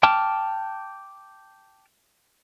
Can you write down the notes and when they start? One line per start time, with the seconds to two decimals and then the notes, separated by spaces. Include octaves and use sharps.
0.03 G5 A5 D6 F6